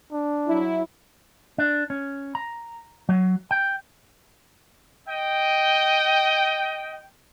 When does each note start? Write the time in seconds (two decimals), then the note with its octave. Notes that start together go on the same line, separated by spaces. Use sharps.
0.12 D4
0.47 F#3 E4
1.58 D4
1.90 C#4
2.35 A#5
3.09 F#3
3.51 G5
5.07 D#5 G5